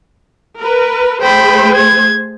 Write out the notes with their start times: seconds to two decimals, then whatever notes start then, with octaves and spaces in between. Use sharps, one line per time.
0.58 A#4 B4
1.22 A3 G#4 C5 G5 B5
1.74 G#6